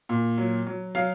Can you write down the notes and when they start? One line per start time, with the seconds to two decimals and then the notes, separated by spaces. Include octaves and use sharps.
0.09 A#2
0.38 F#3
0.67 F#3
0.95 F#3 F5